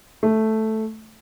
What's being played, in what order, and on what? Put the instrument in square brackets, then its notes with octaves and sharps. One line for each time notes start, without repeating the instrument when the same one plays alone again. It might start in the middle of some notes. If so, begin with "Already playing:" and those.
[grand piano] A3